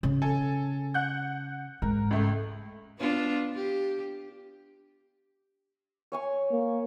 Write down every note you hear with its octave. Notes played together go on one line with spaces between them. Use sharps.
C#3
A4 G#5
F#5 F#6 G6
G#2 A#4
C#2 A3
B3 D4 F4
G4
C#5 G#5 C#6
A#3